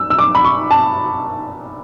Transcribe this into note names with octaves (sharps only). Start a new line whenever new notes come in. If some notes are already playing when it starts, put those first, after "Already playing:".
Already playing: E6
E6
D6
B5
C#6
A5